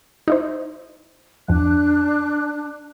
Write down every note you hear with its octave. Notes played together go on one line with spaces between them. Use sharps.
D#4 E4 C5
F2 F3 D4 F#6